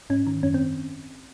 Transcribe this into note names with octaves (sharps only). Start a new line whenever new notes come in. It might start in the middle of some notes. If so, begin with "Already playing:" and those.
G#2 C#4
D#3
F#2 C#4
C4